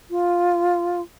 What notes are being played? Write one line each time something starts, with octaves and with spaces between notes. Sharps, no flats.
F4